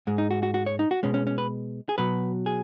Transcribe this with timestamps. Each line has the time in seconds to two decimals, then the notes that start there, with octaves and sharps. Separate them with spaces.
0.07 G#2 G#3
0.18 D#4
0.31 F#4
0.43 F#4
0.54 F#4
0.66 C#5
0.79 D#4
0.91 F#4
1.03 B2 G#3 C#4
1.14 C#4
1.27 C#4
1.38 B4
1.89 G#4
1.98 B2 F#3 B4
2.46 G#4